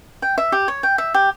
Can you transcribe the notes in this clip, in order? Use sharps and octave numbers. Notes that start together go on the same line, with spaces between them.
G5
E5
G4
C#5
G5
E5
G4